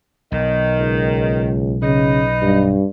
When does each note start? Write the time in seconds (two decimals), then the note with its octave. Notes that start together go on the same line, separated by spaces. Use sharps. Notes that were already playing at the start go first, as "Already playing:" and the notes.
0.32 B1 D#3
0.79 C#2
1.82 C#3 D#4 B4 D#5
2.42 G2